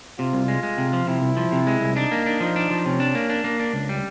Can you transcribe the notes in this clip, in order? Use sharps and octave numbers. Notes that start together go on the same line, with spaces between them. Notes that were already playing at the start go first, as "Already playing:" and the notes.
C3 F4
C2
G#3
G#3
C3
F3
C3 E4
C2
F3
C3
G#3
C2
D4 D#4
A#3
D4
F3 D#4
D4
F3
C3 C#4
D4
A#3
D4
A#3
D4
C#2
G3